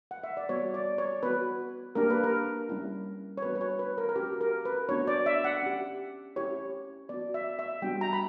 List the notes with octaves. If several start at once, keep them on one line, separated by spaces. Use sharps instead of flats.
F#5
E5
D5
G3 B3 F#4 C#5
D5
C#5
B3 F#4 B4
A#3 D4 G4 A#4
B4
A#4
G3 C#4 E4
C#5
G3 B3 D4 F#4 B4
B4
C#5
B4
A#4
A#4
C#4 F#4 G4
A#4
B4
B3 D4 F#4 C#5
D5
E5
F#5
C#4 G4
C#4 E4 G4 C#5
B3 F#4 D5
E5
E5
G3 B3 D4 F#4 G5
A#5
B5